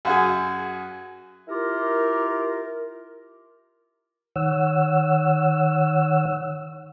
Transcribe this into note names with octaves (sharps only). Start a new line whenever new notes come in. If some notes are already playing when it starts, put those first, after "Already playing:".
F#2 F#4 G#4
E4 F4 G4 A#4
D#3 C#5 F#5 E6